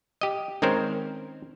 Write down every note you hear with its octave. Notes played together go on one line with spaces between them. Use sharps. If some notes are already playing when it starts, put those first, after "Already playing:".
G4 D#5
D#3 G#3 C4 C#4 A#4 C5